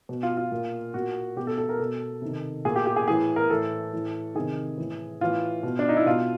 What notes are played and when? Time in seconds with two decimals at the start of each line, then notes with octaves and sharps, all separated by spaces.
0.09 B2
0.23 F4
0.37 F4
0.52 A#2
0.94 A#2 F#4
1.37 B2 G4
1.47 A4
1.58 A4
1.69 A#4
1.79 B2 A4
2.22 C3 D#3
2.65 A#2 G#4
2.76 G4
2.86 G4
2.96 G#4
3.08 A2 E3 G#4
3.36 A#4
3.50 A2 E3 A4
3.93 A2 E3
4.35 C3 D#3 G#4
4.78 A2 E3
5.21 A2 E3 F4
5.63 B2
5.79 D4
5.89 D#4
5.97 E4
6.06 B2 F4